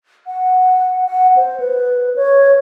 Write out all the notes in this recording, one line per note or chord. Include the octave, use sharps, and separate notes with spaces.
F#5
F#5
C5
B4
C#5